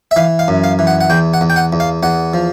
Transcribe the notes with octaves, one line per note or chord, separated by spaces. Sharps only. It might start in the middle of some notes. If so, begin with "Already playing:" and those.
E5
E3 F5
F5
F#2
F5
E3
F#5
F#5
E2 G5
F#5
E2
G5
F#5
E2
F5
E2 F#5
F3